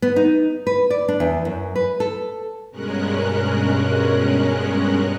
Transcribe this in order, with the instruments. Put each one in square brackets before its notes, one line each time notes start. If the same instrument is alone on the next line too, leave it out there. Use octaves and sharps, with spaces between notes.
[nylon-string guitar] B3
D#4
B4
D5
D4
E2
F#2
B4
A4
[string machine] G2 B2 G#3 C#4 A#4 F#6